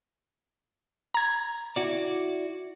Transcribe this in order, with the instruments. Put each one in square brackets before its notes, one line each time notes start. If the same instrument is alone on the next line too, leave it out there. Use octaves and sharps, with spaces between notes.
[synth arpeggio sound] A#5 G#6
[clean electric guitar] E4 F#4 D5